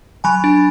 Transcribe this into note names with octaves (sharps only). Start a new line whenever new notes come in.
F#3 G#5 B5
D4